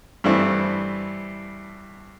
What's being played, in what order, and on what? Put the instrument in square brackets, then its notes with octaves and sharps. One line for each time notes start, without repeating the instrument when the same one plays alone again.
[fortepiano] G2 E3 A3 C4 E4